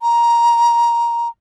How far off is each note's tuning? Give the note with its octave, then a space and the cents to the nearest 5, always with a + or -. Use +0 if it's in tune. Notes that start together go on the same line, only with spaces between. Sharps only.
A#5 +10